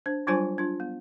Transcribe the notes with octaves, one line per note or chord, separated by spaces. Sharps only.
D4 C5
F#3 G3 D4 F4 C5 G#5
D4 F4
B3